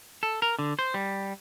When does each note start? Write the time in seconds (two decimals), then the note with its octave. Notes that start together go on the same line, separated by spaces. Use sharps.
0.23 A4
0.42 A#4
0.59 D3
0.79 C5
0.94 G3